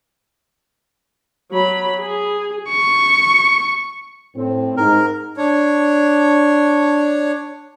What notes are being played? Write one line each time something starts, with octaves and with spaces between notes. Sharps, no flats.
F#3 B5
G#4
C#6
A2 C4
G#2 A#4
D4 C#5